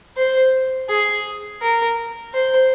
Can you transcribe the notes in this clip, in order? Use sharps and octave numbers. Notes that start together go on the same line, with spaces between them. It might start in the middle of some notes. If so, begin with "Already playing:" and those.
C5
G#4
A#4
C5